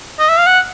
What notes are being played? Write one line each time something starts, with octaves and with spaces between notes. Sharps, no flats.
D#5
E5
F5
F#5